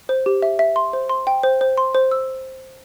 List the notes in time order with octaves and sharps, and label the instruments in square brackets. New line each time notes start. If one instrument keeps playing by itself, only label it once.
[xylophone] C5
G4
E5
E5
C6
C5
C6
G5
C5
C5
C6
C5
E6